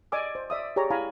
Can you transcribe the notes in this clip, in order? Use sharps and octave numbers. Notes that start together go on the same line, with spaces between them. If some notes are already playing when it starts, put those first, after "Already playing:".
D5 D#5 G#5 D6 E6
C5
D5 E5 D#6
G4 G#4 C#5 D5 A#5
E4 F5 G#5 A#5 B5